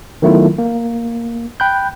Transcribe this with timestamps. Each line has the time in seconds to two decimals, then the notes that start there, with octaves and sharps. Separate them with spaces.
0.22 D#3 F#3 A3 B3 E4 F4
0.58 A#3
1.60 G5 B5 F#6 G6